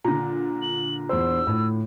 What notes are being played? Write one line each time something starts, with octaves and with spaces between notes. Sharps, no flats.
A#2 D3 A#5
F#7
E2 C5 E6
A2